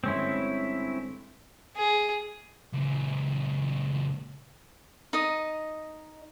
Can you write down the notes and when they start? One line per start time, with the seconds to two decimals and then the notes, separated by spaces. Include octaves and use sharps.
0.04 G1 G#3 C4 C#4 E4 C6
1.76 G#4
2.74 C#2 A#2
5.13 D#4 D#5